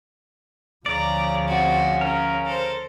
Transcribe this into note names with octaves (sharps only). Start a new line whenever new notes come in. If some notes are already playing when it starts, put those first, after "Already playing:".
D2 C#3 F3 D5 A#5
C4 F#4
C#4 A#4
A4 C5